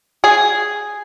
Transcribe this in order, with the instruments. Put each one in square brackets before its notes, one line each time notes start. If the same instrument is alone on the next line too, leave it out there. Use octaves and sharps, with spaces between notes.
[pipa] G#4